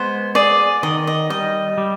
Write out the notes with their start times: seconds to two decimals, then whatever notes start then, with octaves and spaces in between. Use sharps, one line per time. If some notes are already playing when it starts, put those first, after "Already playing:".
Already playing: G#3 B3 C5
0.35 G#4 D5
0.83 D#3 D#5
1.07 D#5
1.30 G3 D#5
1.78 G3